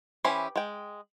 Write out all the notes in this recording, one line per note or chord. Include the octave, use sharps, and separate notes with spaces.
E3 C#4 E4 G4 C5
G#3 G5